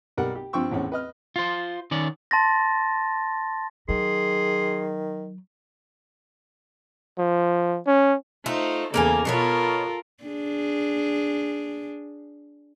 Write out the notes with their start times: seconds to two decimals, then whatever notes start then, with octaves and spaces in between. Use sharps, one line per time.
0.17 B1 G3 A#4 F#5
0.35 G4
0.53 G2 F3 C4 G5 C#6 E6
0.71 E2 A2 C4 C#4
0.92 B4 D#5 F6
1.36 F4 C5
1.91 D#3 C#4 D5
2.31 A5 C6 A6 A#6
3.89 D#3 F#3 G#4 C6
7.18 F3
7.87 C#4
8.46 A3 D#4 F4 C5
8.94 E2 C#3 A#3 A4 A#4 G#5
9.25 B2 B3 F4 A4 A#4 C#5
10.24 D4 G#4